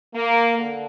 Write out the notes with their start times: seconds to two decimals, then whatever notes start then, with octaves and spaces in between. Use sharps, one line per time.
0.14 A#3
0.58 D3